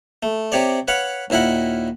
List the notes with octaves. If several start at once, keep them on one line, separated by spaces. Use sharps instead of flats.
A3
C3 G4 C#5 D5
B4 C#5 F5 F#5
D#2 A#2 E4 A#4 F#5